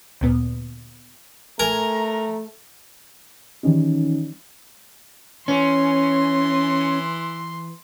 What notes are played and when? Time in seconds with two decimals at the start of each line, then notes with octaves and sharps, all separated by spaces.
0.21 D2 A#2 B3
1.60 A3 A#4 G#5 A#5
3.63 D#3 E3 F#3 G3 C#4 D#4
5.48 E3 C#4 C6